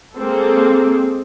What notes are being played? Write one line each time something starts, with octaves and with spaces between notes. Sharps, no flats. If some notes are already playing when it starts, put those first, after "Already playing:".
G#3 A#3 C4 A4